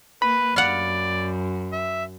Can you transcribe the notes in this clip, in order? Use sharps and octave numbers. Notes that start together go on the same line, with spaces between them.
A#3 B4 B5
F#2 D5 F5 F#5
E5